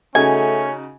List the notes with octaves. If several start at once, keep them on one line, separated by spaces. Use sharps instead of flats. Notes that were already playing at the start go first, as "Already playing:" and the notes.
C#3 A3 C#4 D#4 F#4 G#5